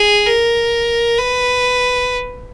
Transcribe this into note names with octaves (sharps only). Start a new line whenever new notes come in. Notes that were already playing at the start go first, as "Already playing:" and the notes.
Already playing: G#4
A#4
B4